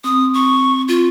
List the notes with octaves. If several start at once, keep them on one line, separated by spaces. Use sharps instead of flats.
C4 D#6
C#6
F4